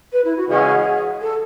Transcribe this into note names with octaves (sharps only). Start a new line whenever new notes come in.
B4
E4
F#4
C#3 E3 G#3 C#4 F#4 G#4
A4